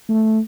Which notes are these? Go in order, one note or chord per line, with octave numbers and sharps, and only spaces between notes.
A3